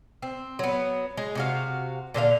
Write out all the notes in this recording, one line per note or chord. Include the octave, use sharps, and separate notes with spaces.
C4
F#3 B3
G#3
C3 F#4 F5
A#2 D3 A4 F5